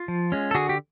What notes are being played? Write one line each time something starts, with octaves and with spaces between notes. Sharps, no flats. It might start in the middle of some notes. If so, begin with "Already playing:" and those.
Already playing: F4
F3
G#3 C#4
A4
D3 F#4 G#4
G4